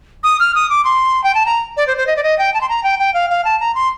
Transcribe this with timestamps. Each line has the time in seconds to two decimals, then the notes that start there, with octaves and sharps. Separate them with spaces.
0.24 D#6
0.40 F6
0.55 D#6
0.70 D6
0.85 C6
1.24 G5
1.35 A5
1.46 A#5
1.77 D5
1.87 C5
1.97 C5
2.07 D#5
2.16 D5
2.23 D#5
2.39 G5
2.54 A5
2.61 C6
2.69 A#5
2.84 G5
2.99 G5
3.14 F5
3.30 F5
3.45 A5
3.60 A#5
3.75 C6